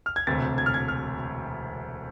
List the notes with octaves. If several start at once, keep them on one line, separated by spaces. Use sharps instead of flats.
F6
G#6
E1 D2 C3 A6
G#6
F6
G#6
F6